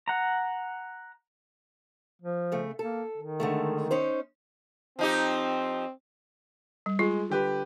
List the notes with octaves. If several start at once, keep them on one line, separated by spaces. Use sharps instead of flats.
F#5 A#5
F3
C#3 A3
A#3 A4
D#3
D3 G#3 A3
C#4 D#4 C5
F3 C4 D#4 G4
G3
G#3 F4
D3 G4 B4